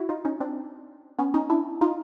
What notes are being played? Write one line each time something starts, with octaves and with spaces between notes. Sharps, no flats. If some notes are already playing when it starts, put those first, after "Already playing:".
Already playing: E4 F#4
D#4 F4
C#4 D#4
C4 D4
B3 C#4
C#4 D#4
D4 E4
D#4 F4